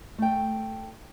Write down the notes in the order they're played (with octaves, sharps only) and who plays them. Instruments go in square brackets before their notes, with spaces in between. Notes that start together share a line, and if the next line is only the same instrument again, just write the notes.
[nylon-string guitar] A3 G5